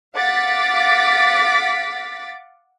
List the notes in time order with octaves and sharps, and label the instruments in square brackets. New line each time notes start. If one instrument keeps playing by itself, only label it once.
[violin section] F5 F#5 D6 A6 B6